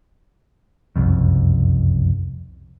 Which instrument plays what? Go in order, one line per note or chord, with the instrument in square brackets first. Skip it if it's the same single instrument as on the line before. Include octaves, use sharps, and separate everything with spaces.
[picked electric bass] F#1 C2 F2